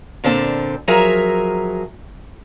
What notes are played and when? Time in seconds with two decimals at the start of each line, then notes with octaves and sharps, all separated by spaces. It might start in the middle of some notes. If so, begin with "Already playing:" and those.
0.24 A#2 D3 C4 A5
0.88 F3 F#3 G#4 A#4 E5 A#5